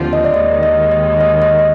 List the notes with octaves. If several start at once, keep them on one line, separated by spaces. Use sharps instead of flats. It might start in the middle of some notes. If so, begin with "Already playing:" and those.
Already playing: D#2 D3 F3 C4 F4
D#5
D5
D#2 D#3 G#3 D#5
D#5
D#5
D#5
D#5
D#5